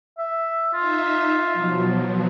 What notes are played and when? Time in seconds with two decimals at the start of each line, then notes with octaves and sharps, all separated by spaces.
0.18 E5
0.73 D#4 F4 E5
1.53 B2 F3 F#3